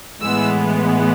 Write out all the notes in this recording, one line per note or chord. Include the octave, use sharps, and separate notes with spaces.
A2 E3 G#3 B3 E6